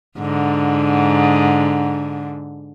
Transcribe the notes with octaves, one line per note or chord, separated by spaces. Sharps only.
G#2 D3